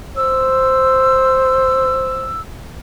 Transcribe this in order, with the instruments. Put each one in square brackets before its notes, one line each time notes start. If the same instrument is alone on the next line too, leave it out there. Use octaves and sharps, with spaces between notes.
[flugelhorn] C5 [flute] E6